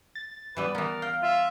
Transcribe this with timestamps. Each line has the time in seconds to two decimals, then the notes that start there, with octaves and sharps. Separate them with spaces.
0.15 A6
0.57 E3 G3 B3 B4
0.75 E3 B3 A#4
1.02 F5 G5
1.22 F4 E5